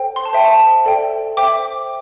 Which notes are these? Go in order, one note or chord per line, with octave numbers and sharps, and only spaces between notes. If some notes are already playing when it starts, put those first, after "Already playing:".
Already playing: A4 C5 G5
C6
A5
C5 E5 G5
A5
A4 D5 G5
C5 E5 G5 D6